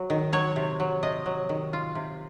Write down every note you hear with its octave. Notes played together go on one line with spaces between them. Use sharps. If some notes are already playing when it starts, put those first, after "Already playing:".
Already playing: F#3
D#3
F#3 C#5
C3
F#3
C3 D#5
F#3
D#3
F4
C3